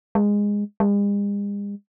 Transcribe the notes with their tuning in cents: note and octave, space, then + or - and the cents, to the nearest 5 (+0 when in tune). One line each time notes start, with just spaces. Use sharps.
G#3 -15
G#3 -45